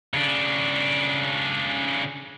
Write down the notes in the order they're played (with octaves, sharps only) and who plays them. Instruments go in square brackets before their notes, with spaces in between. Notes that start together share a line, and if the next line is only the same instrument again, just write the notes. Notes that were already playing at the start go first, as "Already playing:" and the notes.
[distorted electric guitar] C#3 D4